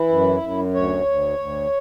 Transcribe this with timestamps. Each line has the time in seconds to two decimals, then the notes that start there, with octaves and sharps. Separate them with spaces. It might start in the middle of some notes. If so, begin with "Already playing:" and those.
Already playing: E3 E4
0.09 F#2
0.41 F#2
0.74 D2 C#5
1.06 D2
1.38 D2